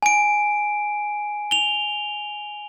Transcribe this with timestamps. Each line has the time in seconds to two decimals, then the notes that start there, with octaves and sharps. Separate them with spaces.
0.03 G#5 D7
1.51 F7 G7